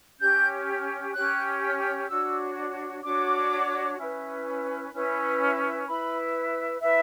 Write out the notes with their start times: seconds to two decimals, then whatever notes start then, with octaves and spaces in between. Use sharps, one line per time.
0.19 C#4 G4 C#5 G6
1.14 C#4 G4 C#5 F#6
2.08 D4 F#4 C#5 E6
3.03 D4 F#4 C#5 D6
3.97 C#4 E4 B4
4.92 C#4 E4 B4
5.87 E4 B4 B5
6.81 E4 B4 E5